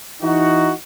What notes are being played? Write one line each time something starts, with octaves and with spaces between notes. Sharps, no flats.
E3 D#4 F#4